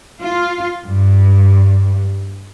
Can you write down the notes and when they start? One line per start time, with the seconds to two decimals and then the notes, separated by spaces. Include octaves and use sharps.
0.20 F4
0.85 G2